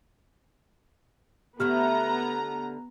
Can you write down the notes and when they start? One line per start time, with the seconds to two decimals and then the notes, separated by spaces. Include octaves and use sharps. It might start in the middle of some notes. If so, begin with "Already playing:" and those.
1.60 D3 A3 B3 E4 G4 A#5 F6